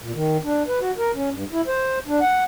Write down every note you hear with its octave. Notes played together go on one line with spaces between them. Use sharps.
A#2
D#3
D4
B4
F#4
A#4
C#4
G2
E4
C5
D4
F#5